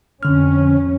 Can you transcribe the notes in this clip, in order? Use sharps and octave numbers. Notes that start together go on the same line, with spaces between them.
F2 D3 C#4 F6